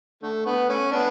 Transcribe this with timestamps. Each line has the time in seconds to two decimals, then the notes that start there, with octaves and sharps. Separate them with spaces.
0.23 D3 A3
0.46 D3 B3
0.69 A3 C#4
0.92 B3 D4